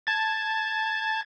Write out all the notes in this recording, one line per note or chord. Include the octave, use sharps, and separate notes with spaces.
A5 G#6 A6